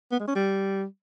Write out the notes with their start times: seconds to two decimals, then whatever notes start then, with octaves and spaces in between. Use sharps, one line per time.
0.12 B3
0.19 G#3
0.27 C#4
0.35 G3